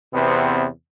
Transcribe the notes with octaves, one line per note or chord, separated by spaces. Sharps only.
E2 C3 B3 C4